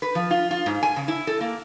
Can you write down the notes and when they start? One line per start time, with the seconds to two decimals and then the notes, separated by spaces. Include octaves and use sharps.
0.02 B4
0.15 F3
0.31 F4
0.51 F4
0.66 G#2
0.83 G#5
0.96 C#3
1.08 E4
1.27 A4
1.41 A#3